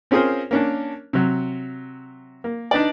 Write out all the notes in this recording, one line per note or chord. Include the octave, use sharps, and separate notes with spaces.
C4 C#4 F4 G#4 A#4 C5
A#3 C#4 D4
C3 F#3
A#3
D4 D#4 B4 D5